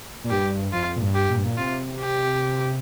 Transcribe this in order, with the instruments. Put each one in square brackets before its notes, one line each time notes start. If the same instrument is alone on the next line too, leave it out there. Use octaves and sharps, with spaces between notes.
[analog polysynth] A#2
[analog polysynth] G2 [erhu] G4
[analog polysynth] F2 [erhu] F4
[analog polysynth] A#2
G2
[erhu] G4
[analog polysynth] A#2
G2
A#2
[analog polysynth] C3 [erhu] F4
[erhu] G4